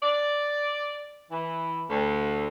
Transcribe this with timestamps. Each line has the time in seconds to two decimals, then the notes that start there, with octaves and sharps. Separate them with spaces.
0.03 D5
1.31 E3
1.89 D2